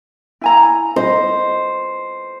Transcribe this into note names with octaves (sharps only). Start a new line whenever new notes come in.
E4 G#5 A#5
C5 D#5